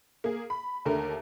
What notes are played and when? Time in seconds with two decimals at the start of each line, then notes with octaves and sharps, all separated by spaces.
0.24 A#3 G#4
0.50 B5
0.85 D#2 D3 A3 A#4